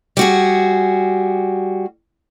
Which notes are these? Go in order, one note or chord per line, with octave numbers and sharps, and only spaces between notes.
G3 F#4 G#4